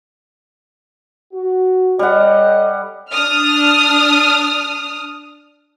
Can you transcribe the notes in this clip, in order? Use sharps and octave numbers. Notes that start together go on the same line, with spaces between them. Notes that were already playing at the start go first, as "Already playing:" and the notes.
F#4
G3 A4 C#5 D#5 F#5
D4 D#6 F6